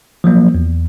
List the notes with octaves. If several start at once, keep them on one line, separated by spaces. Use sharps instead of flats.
F3 F#3 A#3
E2